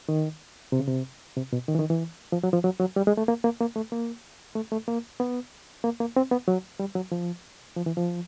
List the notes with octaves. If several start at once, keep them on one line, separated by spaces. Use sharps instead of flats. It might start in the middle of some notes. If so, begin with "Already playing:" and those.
D#3
C3
C#3
C3
C3
B2
D#3
E3
D#3
E3
F3
F#3
F3
F#3
F#3
G3
G#3
A3
A#3
A#3
A#3
A3
A#3
A3
A3
A#3
B3
A#3
A#3
C4
B3
F#3
G3
F#3
F3
F3
E3
F3